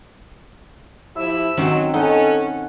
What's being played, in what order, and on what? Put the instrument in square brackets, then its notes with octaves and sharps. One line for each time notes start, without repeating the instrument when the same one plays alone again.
[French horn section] F3 E4 G4 [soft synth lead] E6
[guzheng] D#3 C4 C#4 [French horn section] F#3
[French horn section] C#4 A4 [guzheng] D#4 [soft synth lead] F#5